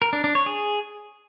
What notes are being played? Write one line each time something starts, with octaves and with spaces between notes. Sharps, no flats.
A#4
D4
D4
C#5
G#4